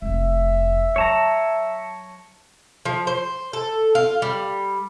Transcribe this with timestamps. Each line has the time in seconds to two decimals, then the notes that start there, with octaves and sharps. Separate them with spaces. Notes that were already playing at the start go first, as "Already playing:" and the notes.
0.02 F1 F2 E5
0.96 F#3 C#5 A5 A#5
2.85 F3
3.07 C5
3.53 A4
3.95 F4
4.22 G3